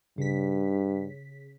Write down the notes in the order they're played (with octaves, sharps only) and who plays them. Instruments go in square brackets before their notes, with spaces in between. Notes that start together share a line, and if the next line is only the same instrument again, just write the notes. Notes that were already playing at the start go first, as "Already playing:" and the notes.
[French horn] G2 [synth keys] C#3 B6